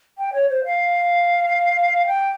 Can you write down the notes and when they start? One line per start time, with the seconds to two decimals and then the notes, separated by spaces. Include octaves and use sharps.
0.18 G5
0.33 C#5
0.49 C5
0.65 F5
2.07 G5